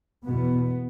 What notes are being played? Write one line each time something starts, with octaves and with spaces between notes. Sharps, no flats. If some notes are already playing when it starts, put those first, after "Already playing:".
E2 B2 B3